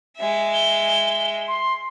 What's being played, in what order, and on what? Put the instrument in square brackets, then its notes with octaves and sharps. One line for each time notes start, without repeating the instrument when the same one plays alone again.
[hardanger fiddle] G#3 E5
[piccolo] G7
C6